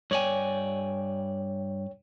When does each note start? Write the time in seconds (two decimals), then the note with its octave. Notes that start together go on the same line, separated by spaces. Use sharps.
0.11 G2 C#5 D5 G5 G#5